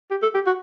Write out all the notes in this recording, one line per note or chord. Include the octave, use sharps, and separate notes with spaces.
G4
A4
G4
F#4